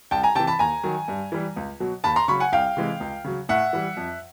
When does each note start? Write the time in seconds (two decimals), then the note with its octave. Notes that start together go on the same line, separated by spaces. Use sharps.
0.11 C2 G5 A5
0.23 G#5 A#5
0.35 C3 G5 A5
0.40 E3
0.47 A5 B5
0.59 D#2 G#5 A#5
0.83 D#3 F#3
1.08 G2
1.32 E3 G3
1.56 C#2
1.80 B2 F#3
2.04 D#2 A5 B5
2.16 A#5 C6
2.28 C#3 F#3 B5 C#6
2.40 F#5 G#5
2.52 C2 F5 G5
2.77 C3 E3 G#3
3.00 C#2
3.24 C#3 F#3
3.49 A2 E5 F#5
3.73 E3 G3
3.97 F2